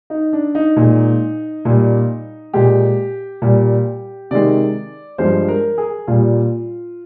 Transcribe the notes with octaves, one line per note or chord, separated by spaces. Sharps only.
D#4
D4
D#4
A#2 G#3
A#2 G3
A#2 G#3 G4
A#2 G3
C3 D#3 G#3 D5
G2 F3 G#3 C5
A#4
G#4
A#2 G3 F4